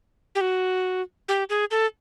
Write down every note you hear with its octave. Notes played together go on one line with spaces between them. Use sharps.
G4
F#4
G4
G#4
A4